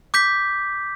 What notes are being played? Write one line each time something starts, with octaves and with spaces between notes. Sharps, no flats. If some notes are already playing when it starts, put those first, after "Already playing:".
D6 G6 B6